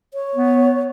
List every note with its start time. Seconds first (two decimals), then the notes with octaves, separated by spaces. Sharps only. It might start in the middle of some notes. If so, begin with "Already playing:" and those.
0.14 C#5
0.35 B3